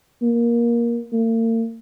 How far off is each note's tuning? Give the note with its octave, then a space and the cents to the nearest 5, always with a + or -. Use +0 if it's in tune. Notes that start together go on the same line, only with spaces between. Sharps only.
A#3 +15
A#3 -45